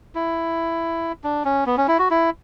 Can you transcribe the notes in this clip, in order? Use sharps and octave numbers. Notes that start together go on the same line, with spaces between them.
E4
D4
C#4
B3
C#4
E4
F#4
E4